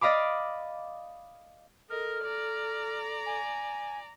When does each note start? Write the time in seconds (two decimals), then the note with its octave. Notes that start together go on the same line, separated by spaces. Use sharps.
0.01 D5 D#5 F5 B5 D6
1.90 A4 A#4 D#5 F6
2.24 D5 A#5
3.26 G#5